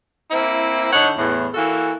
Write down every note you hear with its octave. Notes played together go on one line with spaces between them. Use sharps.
A#3 C4 E4
D3 D#4 C#5 F#5
E2 A2
E3 A#3 F#4 A4